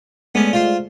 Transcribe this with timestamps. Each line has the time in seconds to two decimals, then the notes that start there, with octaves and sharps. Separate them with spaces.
0.35 G#3 A3 B3 C#4 D5
0.53 F4 C5